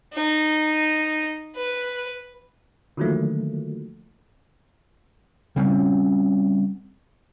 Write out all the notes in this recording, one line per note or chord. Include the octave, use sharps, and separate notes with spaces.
D#4
B4
D3 D#3 F3 F#3 A3 A#3
C#3 G3 C4 C#4